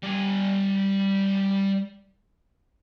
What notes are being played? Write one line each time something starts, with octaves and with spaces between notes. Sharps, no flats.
G3 G#5